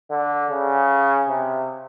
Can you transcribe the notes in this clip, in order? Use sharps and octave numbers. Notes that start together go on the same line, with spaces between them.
D3
C#3
C3